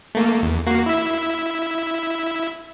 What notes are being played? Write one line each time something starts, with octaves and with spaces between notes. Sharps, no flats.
A3 A#3
E2
A#3 F#4 C7
E4 E5